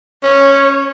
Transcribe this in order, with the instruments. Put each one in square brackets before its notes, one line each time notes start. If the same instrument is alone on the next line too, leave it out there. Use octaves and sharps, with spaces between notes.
[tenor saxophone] C#4 [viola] C#5